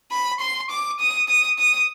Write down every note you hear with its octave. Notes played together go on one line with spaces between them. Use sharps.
B5
C6
D6
D#6
D#6
D#6